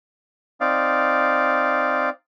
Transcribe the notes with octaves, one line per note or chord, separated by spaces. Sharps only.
C4 D#4 D5 F5